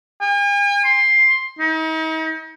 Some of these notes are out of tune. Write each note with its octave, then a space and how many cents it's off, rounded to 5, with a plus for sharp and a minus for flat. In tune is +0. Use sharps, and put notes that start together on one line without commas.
G#5 -45
C6 +10
D#4 +40